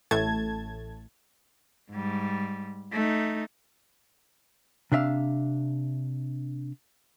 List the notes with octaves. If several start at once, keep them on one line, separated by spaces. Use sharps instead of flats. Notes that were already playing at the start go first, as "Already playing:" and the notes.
A1 A2 A3 A5 G#6
G#2 G3
A3 D#4
C3 D4 E5 F5